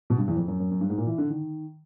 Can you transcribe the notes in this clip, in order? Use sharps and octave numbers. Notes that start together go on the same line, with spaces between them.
B2
G2
E2
F2
F#2
F#2
F#2
G2
G#2
A#2
E3
D3
D#3